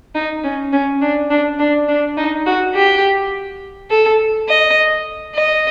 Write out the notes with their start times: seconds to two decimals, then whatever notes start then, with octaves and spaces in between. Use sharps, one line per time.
0.15 D#4
0.44 C#4
0.73 C#4
1.02 D4
1.31 D4
1.59 D4
1.88 D4
2.17 D#4
2.46 F#4
2.75 G4
3.91 A4
4.49 D#5
5.35 D#5